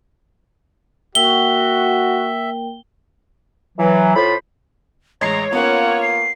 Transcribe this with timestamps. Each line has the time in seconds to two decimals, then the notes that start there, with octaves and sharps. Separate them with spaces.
1.15 A#3 F#4 A#4 E5 G5 G7
3.78 E3 F#3
4.15 A2 F4 C5 B5
5.21 A1 G#3 C#5 A#5 C7
5.53 A#3 B3 C#4 F4 F#5
6.02 C7